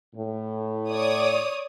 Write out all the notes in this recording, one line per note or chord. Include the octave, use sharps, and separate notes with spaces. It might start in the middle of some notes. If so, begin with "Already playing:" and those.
A2
C#5 D5 D#6